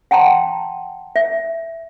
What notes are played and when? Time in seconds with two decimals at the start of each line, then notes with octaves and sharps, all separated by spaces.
0.11 F#5 G5 A5 A#5 C6
1.16 E5